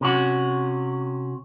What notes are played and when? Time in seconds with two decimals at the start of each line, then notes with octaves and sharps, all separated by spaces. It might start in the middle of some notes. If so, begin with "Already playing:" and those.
0.01 C3 C#4 F#4